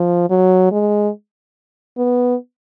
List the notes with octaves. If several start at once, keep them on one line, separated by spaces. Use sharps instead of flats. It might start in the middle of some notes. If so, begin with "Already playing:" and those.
Already playing: F3
F#3
G#3
B3